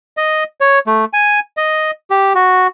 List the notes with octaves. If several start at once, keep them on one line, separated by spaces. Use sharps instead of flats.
D#5
C#5
A3
G#5
D#5
G4
F#4